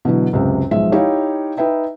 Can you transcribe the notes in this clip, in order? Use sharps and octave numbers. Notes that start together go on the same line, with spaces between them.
B2 D3 E3 F#3
C#2 F#2 C3
B1 F3 G#3 E5
D#4 E4 G4 C#5 F5
D#4 B4 E5 G5